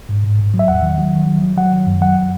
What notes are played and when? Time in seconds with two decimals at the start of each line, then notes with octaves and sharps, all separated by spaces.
0.09 G#2
0.24 A2
0.38 A2
0.54 F#3
0.59 E5
0.68 E2 F#5
0.82 D#3
0.98 F#3
1.13 D#3
1.28 F#3
1.42 F#3
1.57 F#3 F#5
1.72 D#3
1.87 F#2
2.01 F#3 F#5